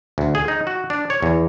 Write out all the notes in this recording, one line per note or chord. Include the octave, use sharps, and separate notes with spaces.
D2
G#4
D#4
F#4
D4
C#5
E2